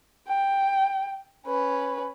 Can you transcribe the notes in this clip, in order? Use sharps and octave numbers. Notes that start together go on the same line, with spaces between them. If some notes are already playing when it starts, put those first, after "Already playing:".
G5
C#4 B4